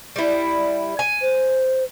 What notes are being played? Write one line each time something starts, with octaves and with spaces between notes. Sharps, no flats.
G3 E4
G#5
C5